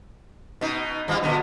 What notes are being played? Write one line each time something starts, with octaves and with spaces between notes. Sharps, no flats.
B2 D#4
G2 G3 F4
A#2 D3 B3